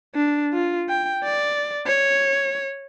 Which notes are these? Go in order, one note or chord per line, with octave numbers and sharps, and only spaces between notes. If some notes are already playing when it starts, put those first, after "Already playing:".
D4
F4
G5
D5
C#5